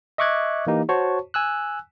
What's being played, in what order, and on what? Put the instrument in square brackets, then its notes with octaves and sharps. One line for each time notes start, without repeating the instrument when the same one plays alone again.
[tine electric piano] D#5 E5 C#6 D6 F#6 G#6
E3 A#3 D#4 G4
F#4 C5 C#5 A5 C#6
G#5 E6 F#6